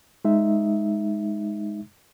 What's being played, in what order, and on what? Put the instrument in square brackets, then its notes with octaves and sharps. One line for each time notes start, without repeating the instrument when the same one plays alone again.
[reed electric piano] G#3 D#4 E5